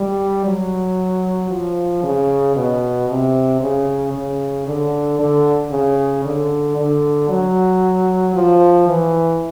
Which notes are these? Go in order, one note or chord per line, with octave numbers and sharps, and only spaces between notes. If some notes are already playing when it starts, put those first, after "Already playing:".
Already playing: G3
F#3
F3
C#3
B2
C3
C#3
C#3
D3
D3
C#3
D3
D3
F#3
F3
E3